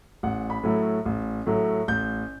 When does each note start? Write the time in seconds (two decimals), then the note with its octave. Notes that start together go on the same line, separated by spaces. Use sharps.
0.23 A1 F#5
0.50 B5
0.64 A2 F#3 A3
1.05 A1
1.47 A2 F#3 A3
1.88 A1 G6